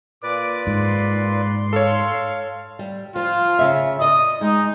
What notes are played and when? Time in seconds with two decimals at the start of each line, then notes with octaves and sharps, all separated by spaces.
0.23 A#2 B4 D5 D6
0.67 G#2 C6
1.73 A4 C#5 F5
2.79 G3
3.16 F3 F4
3.59 C#3 E5
4.00 D5 D#5 D#6
4.41 G#3 D#4